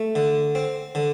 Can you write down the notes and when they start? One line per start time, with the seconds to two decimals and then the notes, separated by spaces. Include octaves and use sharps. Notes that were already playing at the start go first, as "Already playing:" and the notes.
Already playing: A3
0.15 D3
0.55 C4
0.95 D3